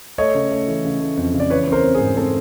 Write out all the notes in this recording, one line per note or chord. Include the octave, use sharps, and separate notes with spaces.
A3 C#5 D#5
C#3
A3
E3
C#3
A3
F2
C#3
D5
E3 B4 C#5
C4 A#4 C5
C4
G#4
G#2
C4 A4